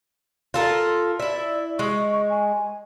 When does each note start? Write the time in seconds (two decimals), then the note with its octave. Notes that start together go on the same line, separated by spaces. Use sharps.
0.54 F4 A4 A#4
1.20 E4 D5 E5
1.79 G#3 C#6
2.29 G#5